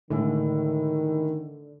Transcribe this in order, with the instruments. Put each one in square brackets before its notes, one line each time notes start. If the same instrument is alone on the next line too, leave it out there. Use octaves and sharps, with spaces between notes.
[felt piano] A2 G#3 A3 [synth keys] D3 [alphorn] D#3